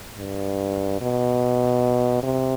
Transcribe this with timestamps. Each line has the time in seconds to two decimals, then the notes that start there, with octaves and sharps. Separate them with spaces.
0.18 G2
1.01 B2
2.23 C3